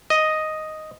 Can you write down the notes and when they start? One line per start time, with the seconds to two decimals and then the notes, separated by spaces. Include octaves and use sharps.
0.10 D#5